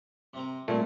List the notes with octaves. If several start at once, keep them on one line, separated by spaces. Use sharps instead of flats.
C3 C4 A#4
A#2 G3 A3 C4